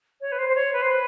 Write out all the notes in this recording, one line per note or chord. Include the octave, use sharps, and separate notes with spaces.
C#5
B4
C5
C5
C#5
B4
C5
B4